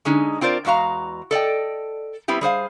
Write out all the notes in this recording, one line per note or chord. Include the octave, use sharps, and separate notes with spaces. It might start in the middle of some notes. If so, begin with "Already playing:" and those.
D3 G#3 C#4 D#4
C4 F4 A#4 C5 D5
E2 G#3 F#4 F5 A#5
A4 D5 D#5 G5
G3 B3 C4 E4 G4
G3 G#4 C5 F5